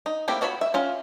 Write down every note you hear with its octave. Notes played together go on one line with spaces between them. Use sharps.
D#4
A3 A#3 C4 E4 G4
F4 F#4 C#5 A5 B5
E5
C#4 F4